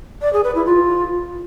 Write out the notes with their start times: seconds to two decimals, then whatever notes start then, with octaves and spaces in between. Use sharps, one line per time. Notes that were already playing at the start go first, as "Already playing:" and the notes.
0.22 D5
0.33 G#4
0.44 B4
0.55 E4
0.66 F4